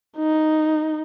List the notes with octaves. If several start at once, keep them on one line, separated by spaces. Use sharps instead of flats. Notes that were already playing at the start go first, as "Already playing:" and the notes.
D#4